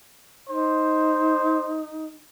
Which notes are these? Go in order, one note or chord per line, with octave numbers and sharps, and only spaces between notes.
D#4 C5